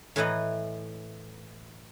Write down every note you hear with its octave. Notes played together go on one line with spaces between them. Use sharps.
A2 E3 E4 B4 D#5 A#5